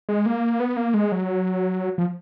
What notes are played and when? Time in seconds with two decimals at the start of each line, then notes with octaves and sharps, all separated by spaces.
0.09 G#3
0.26 A#3
0.60 B3
0.77 A#3
0.94 G#3
1.12 F#3
1.98 F3